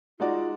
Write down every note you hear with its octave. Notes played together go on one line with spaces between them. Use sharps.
G#3 D#4 F4 F#4 D5